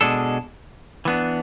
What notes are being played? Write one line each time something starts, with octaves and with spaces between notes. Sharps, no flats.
B2 G#3 D4 A4
E3 B3 D4